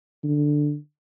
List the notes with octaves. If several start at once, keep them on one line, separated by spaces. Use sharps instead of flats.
D3